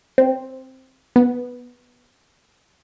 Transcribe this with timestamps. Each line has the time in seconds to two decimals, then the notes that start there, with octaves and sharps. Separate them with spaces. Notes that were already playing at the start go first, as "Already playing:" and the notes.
0.18 C4
1.16 B3